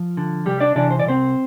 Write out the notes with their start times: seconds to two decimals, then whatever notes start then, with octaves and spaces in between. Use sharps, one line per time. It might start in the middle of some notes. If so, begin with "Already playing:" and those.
Already playing: F3 F4
0.17 D3
0.46 C2 G3 G4
0.60 D4 D5
0.75 C3 E3 D4 D5
0.90 C5
0.99 D5
1.05 C2 C4 C5